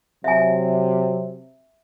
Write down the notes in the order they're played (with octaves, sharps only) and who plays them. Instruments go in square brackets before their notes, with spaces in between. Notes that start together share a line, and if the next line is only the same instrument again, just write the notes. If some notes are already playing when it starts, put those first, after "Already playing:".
[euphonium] C3 [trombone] F#3 [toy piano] E5 G#5